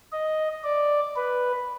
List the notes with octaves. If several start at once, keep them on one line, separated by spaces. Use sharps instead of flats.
D#5
D5
B4